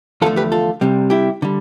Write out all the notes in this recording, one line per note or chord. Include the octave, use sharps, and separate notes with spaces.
E2 D3 F3 A3 F4 A4
G4 B4
F4 A4
C2 C3 G3
E4 G4
D3 G3